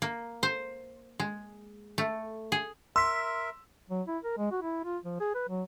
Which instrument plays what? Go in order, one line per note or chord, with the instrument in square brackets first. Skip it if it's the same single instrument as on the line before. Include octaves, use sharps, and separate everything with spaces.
[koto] A#3
C5
G#3
A3
G#4
[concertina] A#4 E5 [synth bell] C6 B6 [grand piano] E6
[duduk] F#3
E4
A#4
G#3
F#4
E4
F4
F3
G#4
B4
F#3